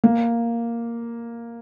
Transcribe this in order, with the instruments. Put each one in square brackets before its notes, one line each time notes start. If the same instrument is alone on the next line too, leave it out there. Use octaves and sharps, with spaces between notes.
[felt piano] A#3